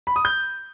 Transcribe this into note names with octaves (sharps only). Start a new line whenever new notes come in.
B5
D#6
G6